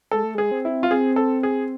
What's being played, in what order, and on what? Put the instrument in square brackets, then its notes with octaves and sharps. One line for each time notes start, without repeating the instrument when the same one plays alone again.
[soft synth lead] G#3 [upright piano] A4
[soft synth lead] A3
[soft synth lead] G#3 [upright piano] G#4
[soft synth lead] C4
[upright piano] E4
F4
[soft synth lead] C4 [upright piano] G#4
[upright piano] A4
G#4